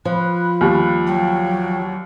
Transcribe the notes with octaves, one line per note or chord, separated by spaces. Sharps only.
F3 B5 F#6
D#2 G3
F#3 G5